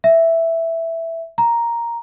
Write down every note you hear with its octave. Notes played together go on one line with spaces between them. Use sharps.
E5
A#5